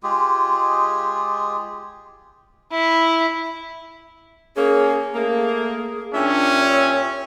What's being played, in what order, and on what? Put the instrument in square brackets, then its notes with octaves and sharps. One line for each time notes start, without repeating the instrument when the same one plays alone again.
[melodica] G#3 F4 G4 G#4
[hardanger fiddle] E4
[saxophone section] A#3 C#4 [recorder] G#4
[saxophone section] A3 A#3 [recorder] G#4
[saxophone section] A#2 G4 E5 [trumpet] C#4 [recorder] D4
[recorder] C#5